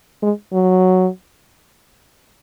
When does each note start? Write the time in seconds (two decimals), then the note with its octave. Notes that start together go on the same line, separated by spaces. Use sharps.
0.22 G#3
0.53 F#3